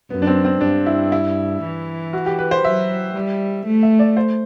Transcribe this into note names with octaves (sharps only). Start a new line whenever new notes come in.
F#2 B3
D4
C4
C4
G2 D4
E4
E4
E3
F#4
G4
B4
C5
F#3 E5
G3
A3
E5
D5
C5